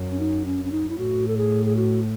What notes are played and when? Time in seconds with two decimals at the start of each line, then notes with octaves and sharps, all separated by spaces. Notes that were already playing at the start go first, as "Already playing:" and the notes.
Already playing: F#2
0.11 C#4
0.20 D#4
0.46 C#4
0.65 C#4
0.72 D#4
0.89 E4
0.98 A2 F#4
1.28 A4
1.37 G#4
1.65 G#4
1.77 F#4